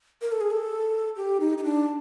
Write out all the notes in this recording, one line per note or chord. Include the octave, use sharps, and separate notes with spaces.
A#4
A4
G#4
A4
G4
D#4
D#4
D4